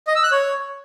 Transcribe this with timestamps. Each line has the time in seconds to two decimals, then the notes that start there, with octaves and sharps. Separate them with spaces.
0.07 D#5
0.15 E6
0.23 F#6
0.32 C#5